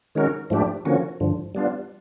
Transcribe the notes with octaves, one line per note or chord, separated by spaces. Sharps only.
D#3 G#3 C#4 F#4 A#4
G#2 F3 A3 D4 G4
D3 F3 A#3 C#4 F#4
G2 D3 F3
G3 B3 D4 F4